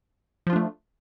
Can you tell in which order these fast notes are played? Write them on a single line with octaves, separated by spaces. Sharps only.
F3 F4 D4 A3